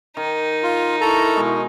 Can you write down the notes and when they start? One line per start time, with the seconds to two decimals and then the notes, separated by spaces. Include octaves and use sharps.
0.17 D#3 D#4
0.63 F4
1.01 E4 A4 A#4 A#5 C#6
1.36 B2 G#3